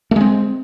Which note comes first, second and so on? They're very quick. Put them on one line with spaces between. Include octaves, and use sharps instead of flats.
A3 G#3 C4